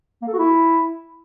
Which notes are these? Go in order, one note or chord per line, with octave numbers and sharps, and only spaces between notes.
A#3
A4
F#4
E4